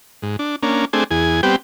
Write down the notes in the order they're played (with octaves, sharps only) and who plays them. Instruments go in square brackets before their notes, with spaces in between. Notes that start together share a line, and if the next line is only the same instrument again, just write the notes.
[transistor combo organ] G#2
D4
A#3 C#4 D4
A3 C4 D4 G#4
E2 G#4
G3 B3 C4 G4